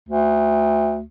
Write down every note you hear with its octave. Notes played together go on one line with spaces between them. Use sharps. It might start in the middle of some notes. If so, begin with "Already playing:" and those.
D2